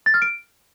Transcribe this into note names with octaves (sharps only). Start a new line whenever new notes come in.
A6
F6
D7